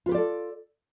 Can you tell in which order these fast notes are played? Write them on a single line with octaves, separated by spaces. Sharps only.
F4 B4 G4 D5 A4